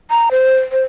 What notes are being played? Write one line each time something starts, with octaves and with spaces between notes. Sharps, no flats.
A#5
C5
C5